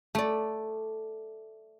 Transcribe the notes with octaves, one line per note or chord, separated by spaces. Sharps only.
A3 D5